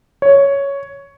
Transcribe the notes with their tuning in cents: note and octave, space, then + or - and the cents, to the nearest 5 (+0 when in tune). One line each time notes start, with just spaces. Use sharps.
C#5 +5